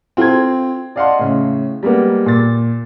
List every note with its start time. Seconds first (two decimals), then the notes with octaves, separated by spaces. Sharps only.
0.17 C4 F4 A4 C6 G#6
0.96 D5 D#5 F5 F#5 A5 C6
1.19 A2 C#3
1.83 G3 G#3 A#3 B3
2.26 A#2 A6